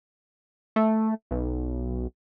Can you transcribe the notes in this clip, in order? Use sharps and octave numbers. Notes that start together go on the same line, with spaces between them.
A3
B1